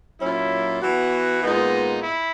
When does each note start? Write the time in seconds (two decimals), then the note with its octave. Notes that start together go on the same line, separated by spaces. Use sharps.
0.21 A#2 F#3 C#4 E4
0.81 E3 B3 F#4
1.42 A#2 G#3 B3 D#4
2.02 E4